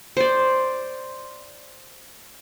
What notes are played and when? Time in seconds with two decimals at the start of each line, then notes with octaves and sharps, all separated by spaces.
0.17 C5 D5